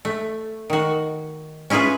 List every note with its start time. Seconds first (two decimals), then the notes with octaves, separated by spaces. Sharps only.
0.05 A3
0.70 D#3 F#4
1.70 C#4 E4 F4 G#4 B4